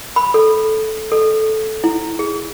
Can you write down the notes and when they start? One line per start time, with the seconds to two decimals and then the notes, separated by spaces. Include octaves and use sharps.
0.16 B5
0.34 A4
1.12 A4
1.84 E4
2.19 G#4